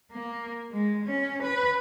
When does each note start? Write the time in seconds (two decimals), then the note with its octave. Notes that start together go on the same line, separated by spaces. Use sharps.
0.12 A#3
0.72 G#3
1.06 C#4
1.42 B4